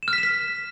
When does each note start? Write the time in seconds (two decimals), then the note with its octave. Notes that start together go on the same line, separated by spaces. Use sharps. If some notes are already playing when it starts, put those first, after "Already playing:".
0.03 E7
0.08 F6
0.13 B6
0.18 E7
0.23 B6